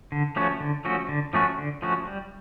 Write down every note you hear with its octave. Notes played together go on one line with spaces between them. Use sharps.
D3
F3 A3 C#4 F#4
D3
F3 A3 C#4 F#4
D3
F3 A3 C#4 F#4
D3
F3 A3 C#4 F#4
G3